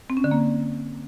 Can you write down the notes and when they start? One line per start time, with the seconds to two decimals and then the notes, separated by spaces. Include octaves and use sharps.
0.10 C4
0.17 C#4
0.24 D3
0.31 A#3